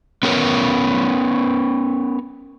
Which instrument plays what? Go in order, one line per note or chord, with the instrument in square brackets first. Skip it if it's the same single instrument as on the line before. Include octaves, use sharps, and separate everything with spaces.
[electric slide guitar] B3 C#4 A#4 B4 C#5